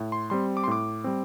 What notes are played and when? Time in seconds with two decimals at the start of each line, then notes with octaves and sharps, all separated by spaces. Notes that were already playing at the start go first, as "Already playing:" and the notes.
Already playing: A2
0.12 C6
0.30 G3 C4 C6
0.57 D6
0.64 C6
0.68 A2 D6
1.04 G3 C4